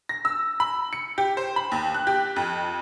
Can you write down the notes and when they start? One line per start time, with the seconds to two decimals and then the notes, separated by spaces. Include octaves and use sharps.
0.09 A#6
0.25 E6
0.60 B5
0.93 C#7
1.18 G4
1.37 C5
1.56 B5
1.72 D#2
1.94 F#6
2.07 G4
2.36 F2